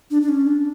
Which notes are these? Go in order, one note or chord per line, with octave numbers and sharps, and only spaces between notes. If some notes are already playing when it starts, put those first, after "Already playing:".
D4
D4
C#4
D4